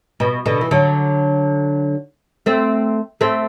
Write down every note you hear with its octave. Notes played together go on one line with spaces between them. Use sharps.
B2
B2 D3
E3
D3 F#3
A3 C4
A3 C4